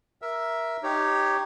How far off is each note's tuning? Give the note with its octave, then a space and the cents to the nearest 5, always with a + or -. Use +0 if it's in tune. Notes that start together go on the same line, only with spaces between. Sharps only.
A#4 +15 E5 +0 E6 +0
D#4 -15 G4 +0 C#5 +0